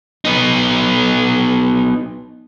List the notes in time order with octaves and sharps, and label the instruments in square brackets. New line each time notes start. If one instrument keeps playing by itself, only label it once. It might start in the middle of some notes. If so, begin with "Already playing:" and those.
[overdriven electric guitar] B3 D#4